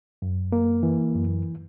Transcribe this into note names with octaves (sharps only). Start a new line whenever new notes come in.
F#2
A#3
E3
F#2